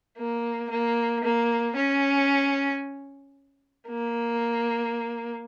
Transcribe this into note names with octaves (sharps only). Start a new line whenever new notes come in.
A#3
A#3
A#3
C#4
A#3